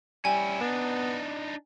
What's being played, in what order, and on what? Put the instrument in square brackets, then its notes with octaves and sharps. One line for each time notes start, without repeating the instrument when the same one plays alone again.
[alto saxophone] G3 [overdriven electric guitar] C#4 E4 [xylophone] G#5
[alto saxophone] B3 [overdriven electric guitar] D4 D#4